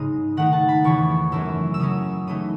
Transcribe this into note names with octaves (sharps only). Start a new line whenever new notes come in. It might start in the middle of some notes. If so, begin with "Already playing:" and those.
Already playing: G#2 C#3 G#3 D#4 D#6
D#3 A3 D#4 F#5
A5
B5
E2 C#3 E3 A3 C#6
F#2 E3 A3 C#4 E6
E6
C#3 F#3 C#4 D#6
C#3 E3 A3 D#4 D#6